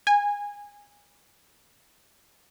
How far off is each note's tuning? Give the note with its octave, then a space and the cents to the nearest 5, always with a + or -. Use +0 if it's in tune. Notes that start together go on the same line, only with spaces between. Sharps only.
G#5 -20